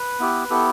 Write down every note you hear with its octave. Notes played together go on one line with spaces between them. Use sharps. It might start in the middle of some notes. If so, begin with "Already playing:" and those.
Already playing: B4
B3 E4 G4
B3 E4 G4 A4